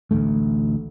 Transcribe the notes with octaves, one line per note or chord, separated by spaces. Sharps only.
A1 D2 A3